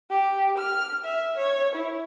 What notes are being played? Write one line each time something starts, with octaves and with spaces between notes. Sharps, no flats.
G4
F6
E5
C#5
E4